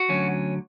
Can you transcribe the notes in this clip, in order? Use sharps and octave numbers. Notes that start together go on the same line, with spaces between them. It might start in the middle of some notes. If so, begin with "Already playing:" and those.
Already playing: F#4
D2 D3 F#3 C#4